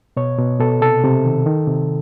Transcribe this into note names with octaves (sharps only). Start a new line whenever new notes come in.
B2 C#5
B2
B2 A4
C3 A4
C3
D#3
D#3
C3